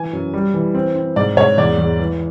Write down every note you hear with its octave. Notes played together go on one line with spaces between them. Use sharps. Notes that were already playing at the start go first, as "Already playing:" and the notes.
Already playing: E3 G#5
F#2
G3
E3
C4
C4
G#2 D5
G#2 C#5
E2 D5
E2
E3